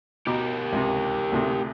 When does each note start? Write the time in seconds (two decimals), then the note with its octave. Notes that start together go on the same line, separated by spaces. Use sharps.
0.27 B2 G4 A#4 D6
0.73 C#2 C3
1.32 D2 A2 C3